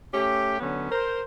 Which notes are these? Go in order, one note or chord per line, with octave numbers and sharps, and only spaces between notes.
A3 C#4 G4
D3 F#3 B3 C#4
A#4 C5